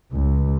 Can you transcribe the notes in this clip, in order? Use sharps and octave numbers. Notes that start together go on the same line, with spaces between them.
C#2